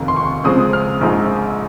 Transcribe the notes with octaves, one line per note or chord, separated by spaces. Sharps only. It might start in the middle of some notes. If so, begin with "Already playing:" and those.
Already playing: F1 D#2 D#3
C6
C#6
C#2 C#3 F3 G#3 C4 D#6
F6
A#1 G#2 F3 G#3 D#4